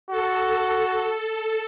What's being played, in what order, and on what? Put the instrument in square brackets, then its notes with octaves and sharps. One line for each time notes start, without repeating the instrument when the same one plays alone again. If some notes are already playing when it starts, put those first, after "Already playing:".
[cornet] F#4 [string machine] A4